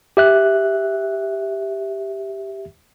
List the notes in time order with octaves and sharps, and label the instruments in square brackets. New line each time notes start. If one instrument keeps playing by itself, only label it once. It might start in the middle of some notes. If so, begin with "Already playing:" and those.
[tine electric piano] G4 E5 F#6